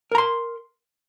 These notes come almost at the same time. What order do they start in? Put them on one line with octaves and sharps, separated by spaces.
A#4 A#5 C6